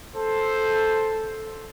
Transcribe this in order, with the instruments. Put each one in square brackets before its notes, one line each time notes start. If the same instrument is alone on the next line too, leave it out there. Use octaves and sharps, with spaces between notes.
[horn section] A4 [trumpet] C5